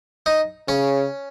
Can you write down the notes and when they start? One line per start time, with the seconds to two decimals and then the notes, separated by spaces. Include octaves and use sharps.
0.26 D#4
0.68 C#3 C#4